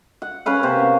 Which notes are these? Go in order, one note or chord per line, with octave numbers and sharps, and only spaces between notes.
F#5
C#4 A#4 B4 F5
C3 A#3 C5
B3